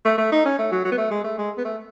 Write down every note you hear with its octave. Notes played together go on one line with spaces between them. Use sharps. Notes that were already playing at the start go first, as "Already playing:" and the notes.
A3
A3
D#4
C#4
A3
F#3
F#3
B3
A3
G#3
A3
G#3
B3
A3